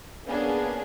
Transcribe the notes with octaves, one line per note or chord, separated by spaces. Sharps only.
A#3 B3 C#4 D4 G#4